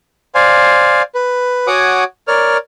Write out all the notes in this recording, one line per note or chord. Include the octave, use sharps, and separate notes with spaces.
C5 D5 F5 G#5
B4
F#4 C#5 F#5 G#5 D6 D#6
A#4 C#5 D5 F6